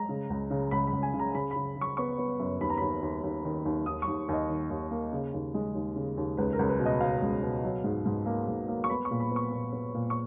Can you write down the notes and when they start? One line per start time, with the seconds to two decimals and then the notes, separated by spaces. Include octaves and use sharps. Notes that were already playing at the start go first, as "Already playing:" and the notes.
Already playing: G#3 A#5
0.09 C#3
0.30 C#2
0.51 C#3
0.71 C#2 B5
0.87 B5
0.93 C#2
1.03 G#5
1.14 C#3
1.19 A#5
1.34 C#3 B5
1.51 B5
1.56 C#3
1.76 C#3
1.81 C#6
1.97 B3 C#6
2.18 B3
2.39 F#2
2.60 D#2 B5
2.70 A#5
2.77 D#2 B5
3.02 D#2
3.23 D#2
3.45 D#3
3.65 D#2
3.86 D#2 D#6
4.02 C#6
4.07 D#2
4.29 D#2 D#5
4.50 D#3
4.70 D#2
4.91 A#3
5.13 C#3
5.34 D#2
5.54 G#3
5.75 D#2
5.96 C#3
6.17 D#2
6.37 C#2 B4
6.53 A#4
6.59 C#2
6.69 B4
6.79 B2
6.86 D#5
7.01 B2 F5
7.22 C#2
7.43 B2
7.63 F#3
7.84 G#2
8.06 G#2
8.26 A#3
8.48 G#2
8.68 A#3
8.84 C#6
8.89 B3 B5
9.05 C#6
9.11 A#2
9.20 B5
9.31 B3
9.36 C#6
9.52 A#2
9.73 B3
9.94 A#2
10.10 C#6